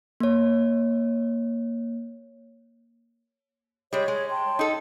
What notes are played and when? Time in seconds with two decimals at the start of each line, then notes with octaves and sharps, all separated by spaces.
0.20 A#3 C#5
3.93 G3 G#3 C#5
4.08 G#3
4.29 G5 A5 C6
4.59 D#4 A4